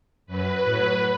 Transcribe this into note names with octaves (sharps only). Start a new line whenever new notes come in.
F#2 F#3 B4
A2 F#3 B4